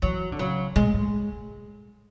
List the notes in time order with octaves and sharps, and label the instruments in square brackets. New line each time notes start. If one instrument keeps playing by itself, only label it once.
[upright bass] E3 [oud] F#3
[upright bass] D3
[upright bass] C#3 [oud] F#3
[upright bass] B2 [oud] G#3
[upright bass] A2